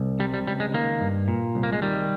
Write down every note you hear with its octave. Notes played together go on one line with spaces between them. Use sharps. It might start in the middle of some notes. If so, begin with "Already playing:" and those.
Already playing: C2
C3 G3
G3
C#2 G3
G#3
D#3 A#3
G2
A#2
C2
A#3
G#3
D#3 G3